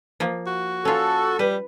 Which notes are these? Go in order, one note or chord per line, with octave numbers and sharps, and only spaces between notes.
F3 A#3
F#4
C#4 F4 A4
G3 B4